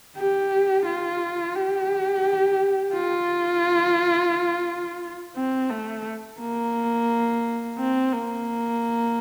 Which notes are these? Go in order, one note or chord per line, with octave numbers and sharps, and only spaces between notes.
G4
F4
G4
F4
C4
A3
A#3
C4
A#3